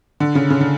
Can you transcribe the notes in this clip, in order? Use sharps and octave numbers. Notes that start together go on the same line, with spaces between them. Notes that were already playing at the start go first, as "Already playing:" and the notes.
D3
C#3
C#3
D3